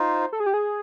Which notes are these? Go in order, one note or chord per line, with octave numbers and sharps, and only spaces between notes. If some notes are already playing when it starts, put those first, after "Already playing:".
Already playing: D#4 F4 C5
A4
G#4
G4
G#4